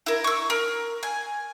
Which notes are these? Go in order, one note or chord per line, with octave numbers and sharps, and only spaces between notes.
E4 A#4
C#6 E6
A#4
G#5